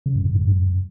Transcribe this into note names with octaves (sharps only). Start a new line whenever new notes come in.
C#3
G2
F#2
G#2
F#2